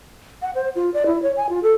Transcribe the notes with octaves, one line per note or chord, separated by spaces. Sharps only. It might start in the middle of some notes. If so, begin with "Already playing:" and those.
F#5
C5
F4
D5
E4
C#5
G#5
F4
A4